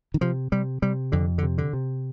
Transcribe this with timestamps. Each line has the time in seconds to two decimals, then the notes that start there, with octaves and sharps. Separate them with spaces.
0.14 D#3
0.21 C3 F3
0.52 C3 G3
0.82 C3 G3
1.12 F2 D3
1.38 D3
1.43 C3
1.58 D3
1.73 C3